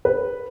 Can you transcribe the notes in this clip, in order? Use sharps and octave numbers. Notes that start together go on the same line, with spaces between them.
B4